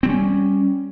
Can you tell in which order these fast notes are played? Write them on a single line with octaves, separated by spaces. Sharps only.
C4 G3 C#4